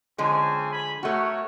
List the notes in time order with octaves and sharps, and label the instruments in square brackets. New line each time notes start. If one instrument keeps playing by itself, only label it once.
[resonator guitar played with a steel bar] D3 F3 G#3 [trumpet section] C4 C#4 G#5
[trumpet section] G#5 B5
[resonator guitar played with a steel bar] A3 F#4 [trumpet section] A#4 C#5 F#5